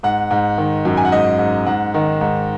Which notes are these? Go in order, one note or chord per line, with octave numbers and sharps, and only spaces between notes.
G#2 F#5
G#2
D#3
F#2
G#5
F#5
G#2 D#5
G#2
G#2 F#5
D#3
G#2